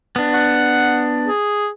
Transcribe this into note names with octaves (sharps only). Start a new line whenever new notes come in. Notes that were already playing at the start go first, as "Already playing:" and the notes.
B3 D4
F#5
G#4